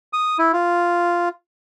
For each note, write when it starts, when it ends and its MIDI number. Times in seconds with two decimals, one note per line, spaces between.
0.13 0.37 87
0.39 0.52 64
0.53 1.29 65